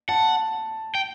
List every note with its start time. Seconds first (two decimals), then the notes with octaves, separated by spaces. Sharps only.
0.09 F#5 A5
0.95 G5